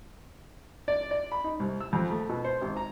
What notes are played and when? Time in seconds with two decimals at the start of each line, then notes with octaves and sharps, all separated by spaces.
0.88 D5
1.11 D5
1.32 B5
1.44 D#4
1.60 C2
1.81 E6
1.93 F2
2.11 A3
2.29 B2
2.45 C5
2.62 G#1
2.77 A#5